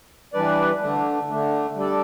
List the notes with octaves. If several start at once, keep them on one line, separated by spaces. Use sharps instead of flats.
E3 G3 D4 B4 D5
D3 A3 D4
D3 A3 D4
G3 D4 A4 D5